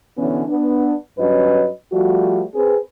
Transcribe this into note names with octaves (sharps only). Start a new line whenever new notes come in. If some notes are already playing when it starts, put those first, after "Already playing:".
B2 D3 E3 B3 C#4
B3 D4
G2 F#3 C#4 B4 D#5
F3 G3 A3 F#4
C4 G#4 B4